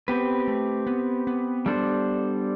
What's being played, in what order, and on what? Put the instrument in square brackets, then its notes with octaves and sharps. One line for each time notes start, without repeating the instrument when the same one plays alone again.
[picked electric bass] B3 [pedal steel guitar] C4 G4 B4
[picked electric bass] A3
B3
B3
[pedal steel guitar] G3 D4 A4 C5